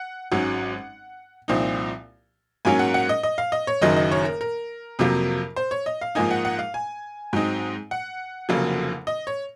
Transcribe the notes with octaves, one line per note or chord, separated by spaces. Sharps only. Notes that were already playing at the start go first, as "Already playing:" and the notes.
Already playing: F#5
G#1 G#2 F#3 C#4 F#5
C2 A#2 F3 C4 D#4
G#2 F#3 A#3 C#4 G#5
F#5
F#5
D#5
D#5
F5
D#5
C#5
F#1 F#2 D#3 F#3 D#5
D#5
C#5
A#4
A#4
F2 C3 F#3 A#3
C5
C#5
D#5
F5
G#2 F3 A#3 D#4 G#5
F#5
F#5
F5
G#5
G#2 F#3 C4 D#4
F#5
F1 F2 C#3 F#3 A#3
D#5
C#5